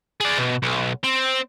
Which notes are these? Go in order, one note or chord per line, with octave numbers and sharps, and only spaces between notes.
G#4 D5
B2
B1
C4